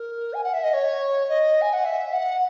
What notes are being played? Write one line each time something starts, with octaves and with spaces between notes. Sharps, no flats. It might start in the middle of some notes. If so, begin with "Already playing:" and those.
Already playing: A#4
G#5
F#5
E5
D#5
C#5
D#5
G#5
F#5
E5
F#5